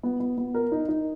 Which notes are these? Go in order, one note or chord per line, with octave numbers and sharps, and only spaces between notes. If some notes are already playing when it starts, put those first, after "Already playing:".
B3
B3
B3
A#4
D#4
D#4